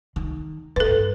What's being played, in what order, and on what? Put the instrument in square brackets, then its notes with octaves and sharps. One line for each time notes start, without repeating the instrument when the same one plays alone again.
[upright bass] D#3
[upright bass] G2 [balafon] A4 B4